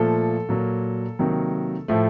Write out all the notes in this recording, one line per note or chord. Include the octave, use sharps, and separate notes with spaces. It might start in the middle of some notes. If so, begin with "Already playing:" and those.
Already playing: A#2 F3 A3 A4
A#2 F#3 A#3
C3 D#3 F#3 A#3
A2 F3 A3